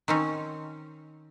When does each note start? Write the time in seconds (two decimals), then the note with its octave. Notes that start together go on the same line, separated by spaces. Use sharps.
0.08 D#3 C4 C#4